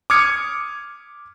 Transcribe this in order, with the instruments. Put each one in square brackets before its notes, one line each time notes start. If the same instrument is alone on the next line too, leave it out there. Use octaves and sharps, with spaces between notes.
[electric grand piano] D6 D#6 F6 G#6 C#7